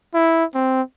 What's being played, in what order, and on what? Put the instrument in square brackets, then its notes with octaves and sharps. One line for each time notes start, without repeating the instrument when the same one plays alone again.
[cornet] E4
C4